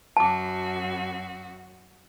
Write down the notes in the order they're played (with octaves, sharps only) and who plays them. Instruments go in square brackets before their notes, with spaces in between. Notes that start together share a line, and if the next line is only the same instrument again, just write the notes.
[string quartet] F#2 F#4 [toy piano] A5 D6